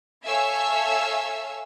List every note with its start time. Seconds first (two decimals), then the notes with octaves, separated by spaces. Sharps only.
0.25 A4 C#5 E5 F5 G#5 E6